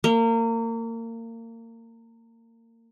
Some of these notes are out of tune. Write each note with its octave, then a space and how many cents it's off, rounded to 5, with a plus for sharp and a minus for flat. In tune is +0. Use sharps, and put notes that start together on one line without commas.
A#3 -30